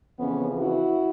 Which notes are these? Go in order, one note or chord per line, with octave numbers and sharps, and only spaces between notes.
F2 C#3 E3 B3 C#4
E4 F#4